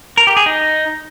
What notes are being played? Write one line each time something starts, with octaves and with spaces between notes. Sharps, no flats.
A#4
G4
G#4
D#4